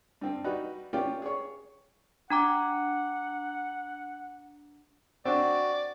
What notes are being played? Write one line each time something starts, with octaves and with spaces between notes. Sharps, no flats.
G2 C4
G3 D#4 F#4 B4
C#4 F4 G4 D5
G#4 C#5
D4 F#5 A#5 D6
C4 D4 F#4 D5